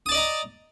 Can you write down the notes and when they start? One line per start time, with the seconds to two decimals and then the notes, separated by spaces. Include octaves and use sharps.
0.06 D#6
0.09 A5
0.12 D5
0.14 D#5
0.17 A#5